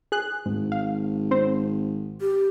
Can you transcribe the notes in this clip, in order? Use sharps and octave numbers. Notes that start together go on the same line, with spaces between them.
G#4 F#6
G#1 G#2
F5
C4 C5
G4